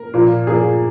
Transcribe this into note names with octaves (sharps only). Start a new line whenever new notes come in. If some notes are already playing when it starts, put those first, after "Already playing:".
Already playing: A#4
A#2 F3 A#3
A#2 F3 A#3 G#4